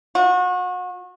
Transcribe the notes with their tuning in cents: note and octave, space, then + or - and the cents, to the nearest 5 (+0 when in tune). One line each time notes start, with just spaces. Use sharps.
F#4 -35